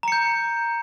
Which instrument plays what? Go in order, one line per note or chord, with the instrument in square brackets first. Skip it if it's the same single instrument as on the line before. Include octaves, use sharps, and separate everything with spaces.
[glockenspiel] A#5
C#7
G6